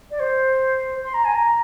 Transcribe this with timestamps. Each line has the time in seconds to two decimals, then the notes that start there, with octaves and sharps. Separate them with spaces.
0.11 D5
0.19 C5
1.03 C6
1.14 A#5
1.24 G#5
1.35 A#5